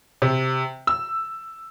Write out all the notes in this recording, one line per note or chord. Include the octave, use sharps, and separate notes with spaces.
C3
E6